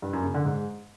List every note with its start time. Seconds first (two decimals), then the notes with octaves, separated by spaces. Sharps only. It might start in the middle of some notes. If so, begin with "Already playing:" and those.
0.02 G2
0.13 F#2
0.24 C#3
0.34 D3
0.45 G#2